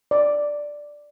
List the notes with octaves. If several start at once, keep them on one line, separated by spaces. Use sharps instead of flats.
D5